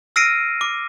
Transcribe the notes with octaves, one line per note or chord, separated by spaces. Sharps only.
E6 F6 A#6 C7 D7 D#7
D6